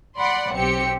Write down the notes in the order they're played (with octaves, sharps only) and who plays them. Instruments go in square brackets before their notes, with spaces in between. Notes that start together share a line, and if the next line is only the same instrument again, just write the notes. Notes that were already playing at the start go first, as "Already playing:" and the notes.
[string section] D5 F#5 B5 C6
B1 C4 G4 C#7